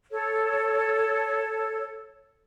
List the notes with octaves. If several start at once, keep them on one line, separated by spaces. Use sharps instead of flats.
A4 C#5